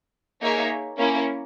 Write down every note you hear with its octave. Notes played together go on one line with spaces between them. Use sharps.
A#3 D#4 G#4 C#5 E5
A#3 C#4 E4